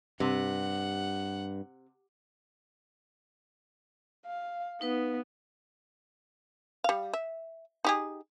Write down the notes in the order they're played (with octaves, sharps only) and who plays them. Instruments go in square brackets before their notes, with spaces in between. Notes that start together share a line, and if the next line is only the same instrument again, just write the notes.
[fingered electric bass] G2 [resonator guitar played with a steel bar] C3 [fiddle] F#5
[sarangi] F5
[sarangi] B3 [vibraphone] D#4 B4
[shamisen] G3 F5
E5
D#4 G4 G#4